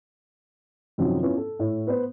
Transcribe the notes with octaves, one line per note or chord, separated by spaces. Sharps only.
F#2 C3 D#3 F3 F#3
B3 C#4 E4 F4
A4
A2 E4 C#5
B3 B4 C5